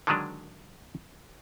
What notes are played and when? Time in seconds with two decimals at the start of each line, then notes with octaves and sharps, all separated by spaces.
0.07 D3 D#3 F#3 G#3 D4